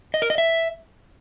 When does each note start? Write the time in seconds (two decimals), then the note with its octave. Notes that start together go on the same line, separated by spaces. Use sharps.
0.14 D#5
0.22 A#4
0.30 D#5
0.38 E5